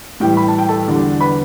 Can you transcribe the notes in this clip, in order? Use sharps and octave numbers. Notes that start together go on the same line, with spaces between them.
A2 E3 G3 G4 G5
B5
A5
G5
A4 A5
E2 D3 G3 D4
B4 B5